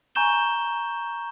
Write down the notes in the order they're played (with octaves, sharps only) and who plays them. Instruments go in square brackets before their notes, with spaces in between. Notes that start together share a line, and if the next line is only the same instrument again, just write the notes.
[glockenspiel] G#5 A#5 C#6 G6 E7 G7